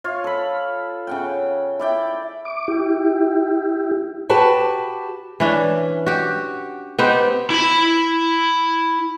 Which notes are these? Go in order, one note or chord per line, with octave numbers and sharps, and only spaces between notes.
F4 C#5 F5
A4 B5
C#3 F#5 G5
E4 D5 G5
D6
E4 G4
F#4 G4 B4 A5
E3 C#4 D4
F#4 G4
B3 C4 D#4 G4
E4 B5